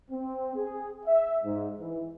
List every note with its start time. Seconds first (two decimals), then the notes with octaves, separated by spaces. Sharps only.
0.11 C4
0.56 G#4
1.06 E5
1.44 G#2
1.80 E3